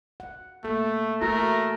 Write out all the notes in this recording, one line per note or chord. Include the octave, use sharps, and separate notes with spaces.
F#5
A3 A#3 A4
A3 E4 F#4 A4 A#4